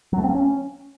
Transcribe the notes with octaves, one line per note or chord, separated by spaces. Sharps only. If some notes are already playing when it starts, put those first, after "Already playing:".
F#3
A3
C4
A#3
C#4